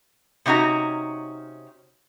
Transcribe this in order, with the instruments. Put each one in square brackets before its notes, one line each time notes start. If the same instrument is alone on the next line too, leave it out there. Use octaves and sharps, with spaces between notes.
[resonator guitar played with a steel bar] C3 C#4 D#4 F#4 A#5